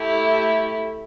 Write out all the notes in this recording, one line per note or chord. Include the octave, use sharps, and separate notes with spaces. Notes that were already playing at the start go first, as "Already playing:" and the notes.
Already playing: A3 E4 G4